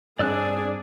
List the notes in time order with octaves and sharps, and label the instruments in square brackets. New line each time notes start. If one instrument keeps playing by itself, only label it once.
[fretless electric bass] G2 C4 [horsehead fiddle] D4 G#4 [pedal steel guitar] D5 E6 F#6